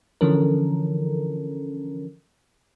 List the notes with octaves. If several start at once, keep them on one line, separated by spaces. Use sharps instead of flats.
D3 E3 F3 C#4 A4 A#4